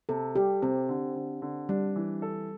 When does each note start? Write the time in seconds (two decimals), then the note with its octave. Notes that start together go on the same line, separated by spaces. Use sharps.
0.09 C3 A4
0.35 G3 G4
0.62 C3 C4
0.89 D3
1.15 D3
1.42 D3
1.69 G3 D4
1.96 E3
2.22 A4